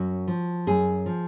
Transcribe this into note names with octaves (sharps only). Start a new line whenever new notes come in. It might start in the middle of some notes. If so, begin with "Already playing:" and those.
Already playing: F#2 F#4
F3
F#2 G#4
F3